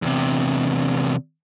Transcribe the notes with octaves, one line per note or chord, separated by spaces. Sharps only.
E2 C3